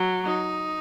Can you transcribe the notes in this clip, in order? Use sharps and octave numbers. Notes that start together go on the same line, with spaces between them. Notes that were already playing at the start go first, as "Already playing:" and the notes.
Already playing: F#3
D#4